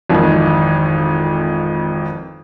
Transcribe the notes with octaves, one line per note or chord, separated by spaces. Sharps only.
G#1 F2 D#3 E3